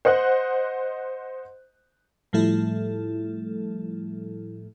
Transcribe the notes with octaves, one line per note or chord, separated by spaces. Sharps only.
C5 D#5 F#5 F#6
A2 F3 G3 A3 E4 A4